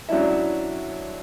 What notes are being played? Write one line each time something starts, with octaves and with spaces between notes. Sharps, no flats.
F#3 C#4 D4 E4 E5